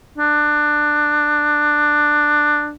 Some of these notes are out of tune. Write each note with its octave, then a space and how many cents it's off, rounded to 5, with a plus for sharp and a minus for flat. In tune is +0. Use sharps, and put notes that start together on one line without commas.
D4 +15